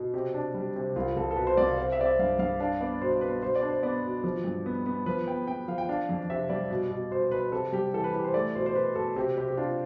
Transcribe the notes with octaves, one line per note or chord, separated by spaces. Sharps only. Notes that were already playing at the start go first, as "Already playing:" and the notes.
Already playing: B2
C3 G4
D4
G3
C3
C2 F4
C2 A4
A4
B2 B4
C5
C2 D5
F5
C4 F5
E5
C4 D5
E5
G2 F5
G2 F5
D4 F5
B3 D5
B2 C5
B3 B4
B2 C5
D5
D4
C5
B3 D5
B2
F3
G2
B3
B3
F3 B4
B3 G5
B3 G5
F3 F5
G5
D4 F5
F2
C3 E5
G3 D5
B2
B2
B2 C5
B2 B4
C3 A4
G3 G4
E3 A4
B4
E3 G4
C5
A3 D5
B2 C5
C5
B2 B4
B2 A4
C3 G4
C3 G4
G4
D4 F4